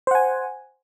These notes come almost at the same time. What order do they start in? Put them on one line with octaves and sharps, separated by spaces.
C5 F#5 G#5